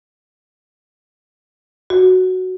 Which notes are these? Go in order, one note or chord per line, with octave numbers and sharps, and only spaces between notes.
F#4